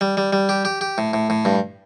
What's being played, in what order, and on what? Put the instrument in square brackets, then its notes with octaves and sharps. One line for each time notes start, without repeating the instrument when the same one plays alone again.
[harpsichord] G3
G3
G3
G4
G4
G4
A2
A2
A2
G2